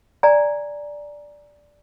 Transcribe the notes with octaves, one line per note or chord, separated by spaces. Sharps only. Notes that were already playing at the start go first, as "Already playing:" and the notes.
D5 G#5 A#5